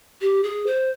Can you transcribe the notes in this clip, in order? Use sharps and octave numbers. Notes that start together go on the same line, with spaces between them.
G4
G#4
C5